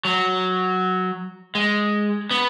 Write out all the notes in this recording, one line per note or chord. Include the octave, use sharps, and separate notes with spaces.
F#3
G#3
B3